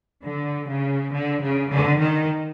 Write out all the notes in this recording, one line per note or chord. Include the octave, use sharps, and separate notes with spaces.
D3
C#3
D3
C#3
D3
D#3